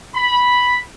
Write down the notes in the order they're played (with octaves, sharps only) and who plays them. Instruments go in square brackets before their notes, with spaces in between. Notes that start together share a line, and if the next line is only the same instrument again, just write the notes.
[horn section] B5